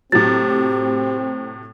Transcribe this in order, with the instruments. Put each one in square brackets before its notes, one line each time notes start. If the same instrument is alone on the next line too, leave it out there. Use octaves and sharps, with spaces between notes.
[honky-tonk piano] A2 C3 F#3 [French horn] C4 [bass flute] G4 [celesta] A6